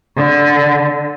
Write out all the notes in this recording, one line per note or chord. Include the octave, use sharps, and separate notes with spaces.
D3